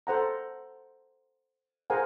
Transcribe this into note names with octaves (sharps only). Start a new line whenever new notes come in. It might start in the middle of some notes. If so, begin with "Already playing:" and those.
A4 C5 F#5 A#5
G#4 A#4 C5 F5 F#5 G#5